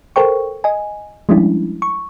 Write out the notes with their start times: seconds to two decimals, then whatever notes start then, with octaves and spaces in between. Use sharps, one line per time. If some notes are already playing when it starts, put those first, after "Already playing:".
0.16 A4 A#4 C5 G5 C#6
0.64 D#5 G#5
1.29 F3 G3 G#3 C#4 D4 E4
1.82 C#6